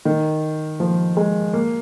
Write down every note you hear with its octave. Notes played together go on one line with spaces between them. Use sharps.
D#3
F3
G#3
A#3